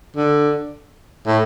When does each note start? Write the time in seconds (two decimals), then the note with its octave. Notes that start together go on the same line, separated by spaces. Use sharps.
0.16 D3
1.26 A2